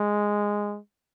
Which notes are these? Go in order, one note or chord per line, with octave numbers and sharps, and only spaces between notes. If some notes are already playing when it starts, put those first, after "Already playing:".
Already playing: G#3